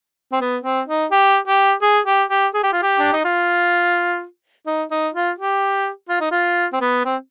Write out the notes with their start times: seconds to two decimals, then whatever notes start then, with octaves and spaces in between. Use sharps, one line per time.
0.32 C4
0.41 B3
0.64 C4
0.88 D#4
1.11 G4
1.47 G4
1.82 G#4
2.06 G4
2.30 G4
2.54 G#4
2.64 G4
2.73 F4
2.82 G4
2.99 D4
3.13 D#4
3.25 F4
4.67 D#4
4.91 D#4
5.14 F4
5.39 G4
6.09 F4
6.21 D#4
6.31 F4
6.73 C4
6.81 B3
7.05 C4